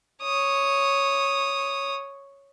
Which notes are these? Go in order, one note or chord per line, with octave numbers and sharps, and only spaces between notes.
C#5 D#6